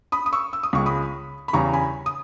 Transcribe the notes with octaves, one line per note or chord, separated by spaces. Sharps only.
B5 D#6
D#6
C#6 E6
E6
D#6
C#2 C#3 G#3 C#6
B5 D#6
B5
E2 C#3 G3 A#5 C#6
G#5 B5
D#6